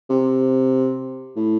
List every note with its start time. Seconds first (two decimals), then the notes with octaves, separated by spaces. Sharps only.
0.10 C3
1.36 A2